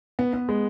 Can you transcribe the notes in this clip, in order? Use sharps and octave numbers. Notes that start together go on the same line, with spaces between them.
B3
B3
G#3